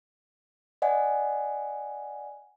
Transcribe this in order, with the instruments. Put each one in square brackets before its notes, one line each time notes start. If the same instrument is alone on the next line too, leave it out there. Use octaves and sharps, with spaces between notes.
[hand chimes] D5 D#5 F#5 G#5